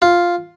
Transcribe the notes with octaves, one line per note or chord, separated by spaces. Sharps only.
F4